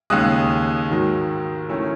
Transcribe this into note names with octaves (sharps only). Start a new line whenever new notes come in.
D#2 C#3 G#3 D#6 F#6
G#2 D#3 F#3
D#3 A3 C#4 E4